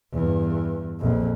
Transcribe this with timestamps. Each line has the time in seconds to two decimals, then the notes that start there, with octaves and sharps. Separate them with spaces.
0.12 E2 G2
0.99 A#1 F2